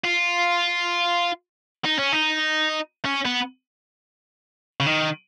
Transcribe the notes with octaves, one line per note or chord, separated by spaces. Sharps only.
F4
D#4
C#4
D#4
C#4
B3
C#3
D#3